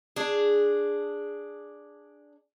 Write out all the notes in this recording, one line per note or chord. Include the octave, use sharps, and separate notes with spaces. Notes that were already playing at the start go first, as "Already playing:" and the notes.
D4 G#4